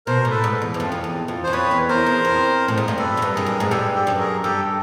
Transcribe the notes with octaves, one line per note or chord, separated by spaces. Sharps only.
B2 A#4 C5
A2
A4 B4
G#2
E2
F#2
F2
F2
E2
F2
C5
F#2
F2 B4 C#5
E2
E2 A#4 C5
E2
F2
A2
G#2
G2
F#2 A4 B4
F#2
G2
G2 G#4 A#4
F#2
G#2
G2 G4 A4
G4 A4
F#2
G#4 A#4
G2 G4 A4